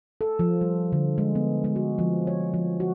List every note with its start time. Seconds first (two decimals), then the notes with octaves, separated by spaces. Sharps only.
0.21 A4
0.39 F3
0.61 G3
0.92 D3
1.18 G#3
1.35 B3
1.64 G#3
1.76 F#4
1.99 F3
2.27 C#5
2.54 F3
2.80 F#4